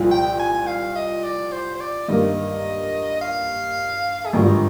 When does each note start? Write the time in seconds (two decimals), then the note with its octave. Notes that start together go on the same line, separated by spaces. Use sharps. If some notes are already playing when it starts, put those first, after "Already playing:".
Already playing: C2 A#2 F3
0.11 G5
0.39 G#5
0.67 F5
0.96 D#5
1.24 D5
1.52 C5
1.75 C5
1.81 D5
2.08 G2 D#3 A#3 D#5
3.21 F5
4.26 G#4
4.33 G#1 G2 D3 F3 A#4